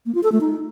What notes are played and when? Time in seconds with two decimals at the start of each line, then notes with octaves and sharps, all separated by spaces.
0.06 A#3
0.15 F4
0.23 A4
0.32 A3
0.41 D#4